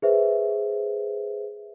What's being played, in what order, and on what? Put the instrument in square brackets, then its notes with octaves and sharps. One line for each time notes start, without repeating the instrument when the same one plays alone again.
[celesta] G#4 B4 C5 E5